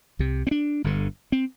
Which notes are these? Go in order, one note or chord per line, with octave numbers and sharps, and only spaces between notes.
C2 C3
C4
D4
G1 G2 D3
C4